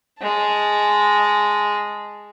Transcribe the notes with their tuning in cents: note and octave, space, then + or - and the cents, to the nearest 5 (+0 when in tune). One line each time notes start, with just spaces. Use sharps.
G#3 +0 A5 +0